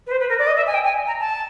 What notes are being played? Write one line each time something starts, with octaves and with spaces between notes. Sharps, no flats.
B4
C5
B4
A#4
D5
D#5
E5
G#5
G5
G#5
A#5
A5